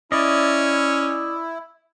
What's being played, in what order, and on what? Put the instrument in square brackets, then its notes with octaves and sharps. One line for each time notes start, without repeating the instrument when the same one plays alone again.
[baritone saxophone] C#4 [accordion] E4 [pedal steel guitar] D5 D#5